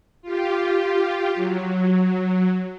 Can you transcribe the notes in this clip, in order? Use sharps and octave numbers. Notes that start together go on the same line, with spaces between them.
F4 G4
F#3